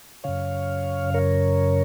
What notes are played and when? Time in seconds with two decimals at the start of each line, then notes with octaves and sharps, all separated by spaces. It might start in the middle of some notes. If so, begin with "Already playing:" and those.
0.24 F#2 C#3 C#5 F5
1.14 A#4 C#5